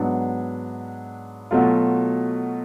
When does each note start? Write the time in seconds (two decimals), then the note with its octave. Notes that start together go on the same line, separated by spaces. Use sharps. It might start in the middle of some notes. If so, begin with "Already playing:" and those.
Already playing: G#2 F#3 B3 D4
1.51 B2 F#3 A3 F4